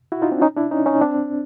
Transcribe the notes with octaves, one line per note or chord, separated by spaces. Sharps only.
E4 F#4
D#4 F4
C4 D4
C#4 D#4
D4 E4
C#4 D#4
C#4 D#4
C4 D4